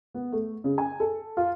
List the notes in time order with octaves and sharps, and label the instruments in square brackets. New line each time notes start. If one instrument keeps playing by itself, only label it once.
[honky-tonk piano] B3
A3
C#3
G#5
A4
F4